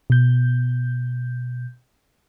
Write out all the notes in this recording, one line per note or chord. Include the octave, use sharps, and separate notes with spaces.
B2 G6